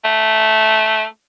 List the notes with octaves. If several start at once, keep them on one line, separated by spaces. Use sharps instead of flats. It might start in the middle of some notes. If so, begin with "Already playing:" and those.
A3